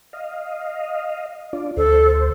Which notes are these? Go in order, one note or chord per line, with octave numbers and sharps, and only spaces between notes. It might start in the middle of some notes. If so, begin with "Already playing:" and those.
D#5 F5
D4 F4 D5
D2 A4 C5